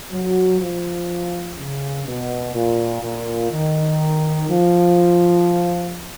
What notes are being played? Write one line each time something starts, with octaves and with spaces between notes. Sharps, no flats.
F#3
F3
C#3
B2
A#2
A#2
D#3
F3